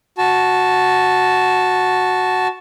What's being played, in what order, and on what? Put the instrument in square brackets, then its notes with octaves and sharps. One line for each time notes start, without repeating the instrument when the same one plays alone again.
[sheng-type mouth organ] F#4 A5